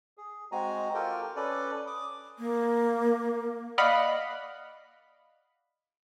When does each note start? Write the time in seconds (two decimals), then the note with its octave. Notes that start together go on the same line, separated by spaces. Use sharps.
0.18 G#4
0.52 G#3 C4 F#4 G#5 A#5
0.94 F4 G4 A4 A#4 G5
1.36 C#4 A4 B4 D5 G#5
1.87 D6 D#6
2.39 A#3
3.78 D5 D#5 F5 F#5 B5